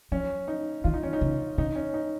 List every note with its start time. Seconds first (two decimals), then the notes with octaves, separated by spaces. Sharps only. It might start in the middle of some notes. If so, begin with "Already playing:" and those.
0.12 F3 C#4
0.48 D#4
0.84 D#3 F4
0.94 D#4
1.03 C#4
1.13 D#4
1.21 C#3
1.58 C#3 D#4
1.76 C#4
1.94 D#4